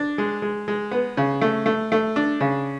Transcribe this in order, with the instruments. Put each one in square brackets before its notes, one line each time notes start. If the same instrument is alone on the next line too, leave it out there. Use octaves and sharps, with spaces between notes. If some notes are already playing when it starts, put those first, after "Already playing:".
Already playing: [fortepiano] D4
G#3
G#3
G#3
B3
C#3
A3
A3
A3
D4
C#3